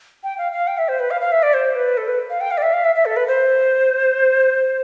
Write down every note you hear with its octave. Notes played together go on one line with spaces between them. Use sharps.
G5
F5
F5
G5
E5
C5
B4
F5
F5
E5
D5
C5
B4
A4
B4
F5
G5
F5
D5
E5
F5
E5
E5
A4
B4
C5